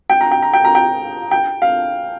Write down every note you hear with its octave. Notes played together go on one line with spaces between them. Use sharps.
G5
A#5
G5
A#5
G5
A#5
G5
G5
F5